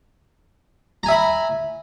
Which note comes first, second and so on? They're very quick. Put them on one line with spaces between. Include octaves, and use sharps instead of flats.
A#5 G#5 E5 B5